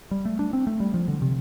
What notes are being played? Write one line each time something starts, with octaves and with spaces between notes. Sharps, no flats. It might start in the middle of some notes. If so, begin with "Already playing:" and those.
G3
A3
D4
C4
A3
G3
F3
D3
C3